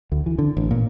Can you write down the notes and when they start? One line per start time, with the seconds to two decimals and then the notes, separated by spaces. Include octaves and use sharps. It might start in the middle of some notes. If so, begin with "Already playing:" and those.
0.12 D2
0.26 E3
0.39 D3
0.57 A1
0.71 A#2